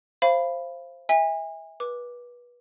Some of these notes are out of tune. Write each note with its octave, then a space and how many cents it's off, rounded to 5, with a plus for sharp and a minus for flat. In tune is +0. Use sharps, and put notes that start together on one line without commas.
C5 +10 F5 -25 B5 +0
E5 -25 G#5 -35
B4 -25 D6 +0